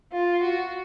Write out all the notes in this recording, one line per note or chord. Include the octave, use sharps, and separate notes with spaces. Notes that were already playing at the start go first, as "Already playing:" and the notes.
F4
F#4